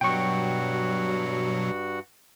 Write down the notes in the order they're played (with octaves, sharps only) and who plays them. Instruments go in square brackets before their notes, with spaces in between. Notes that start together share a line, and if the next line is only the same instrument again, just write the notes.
[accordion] G2 F#4 F#5 [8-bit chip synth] B2 F#3 [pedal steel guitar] G5 C#6